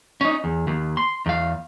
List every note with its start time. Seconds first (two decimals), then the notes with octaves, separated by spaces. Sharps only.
0.21 C#4 D#4
0.44 E2
0.67 D#2
0.97 C6
1.26 E2 F5